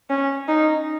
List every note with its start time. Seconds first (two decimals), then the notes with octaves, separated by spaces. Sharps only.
0.10 C#4
0.48 D#4